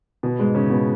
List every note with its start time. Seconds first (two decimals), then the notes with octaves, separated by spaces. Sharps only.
0.23 B2 B3
0.39 G#2 G#3
0.55 C#3 C#4
0.70 B2 B3